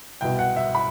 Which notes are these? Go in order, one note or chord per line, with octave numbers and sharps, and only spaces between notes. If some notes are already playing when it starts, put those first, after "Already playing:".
C2 B2 G5
F#5
E5
B5